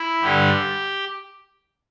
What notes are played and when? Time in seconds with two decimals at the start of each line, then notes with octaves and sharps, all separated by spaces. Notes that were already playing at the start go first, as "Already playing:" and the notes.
Already playing: E4
0.21 G2 D3 G3 G4